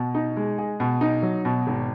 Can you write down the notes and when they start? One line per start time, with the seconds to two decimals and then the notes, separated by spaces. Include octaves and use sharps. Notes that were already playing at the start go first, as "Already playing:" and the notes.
Already playing: B2
0.14 D#4
0.37 G#3
0.58 G#4
0.80 B2
1.01 D#4
1.22 F#3
1.45 B2
1.67 G#1